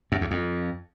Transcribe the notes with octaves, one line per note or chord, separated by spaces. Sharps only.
F#2
E2
F2